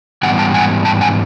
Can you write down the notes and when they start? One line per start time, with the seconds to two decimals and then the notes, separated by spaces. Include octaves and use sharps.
0.23 G#2 E3 G3 B3 F#5 G#5
0.39 G5 A5
0.54 F#5 G#5
0.85 G5 A5
1.01 F#5 G#5